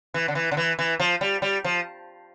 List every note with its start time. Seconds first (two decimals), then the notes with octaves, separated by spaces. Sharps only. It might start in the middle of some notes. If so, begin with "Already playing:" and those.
0.14 E3
0.28 D3
0.35 E3
0.51 D3
0.57 E3
0.79 E3
0.99 F3
1.21 G3
1.42 G3
1.64 F3